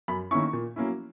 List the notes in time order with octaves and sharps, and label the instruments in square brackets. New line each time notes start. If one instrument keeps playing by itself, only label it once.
[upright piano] F#2 B5
D#3 A#3 C#4 E4 C#6
A#2
F#3 A#3 C#4 E4